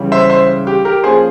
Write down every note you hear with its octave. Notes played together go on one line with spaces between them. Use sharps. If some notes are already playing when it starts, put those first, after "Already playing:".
Already playing: C#2 C#3 E3 G3 C#4
C5 E5
C5 E5
G4
G4 A#4
F3 A#3 C#4 G#4 C5